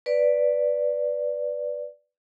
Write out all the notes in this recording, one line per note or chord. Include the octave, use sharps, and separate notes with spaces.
B4 D5